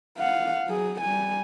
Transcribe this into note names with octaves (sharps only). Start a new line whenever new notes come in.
F5 F#5
F#3 G#4
G3 G#5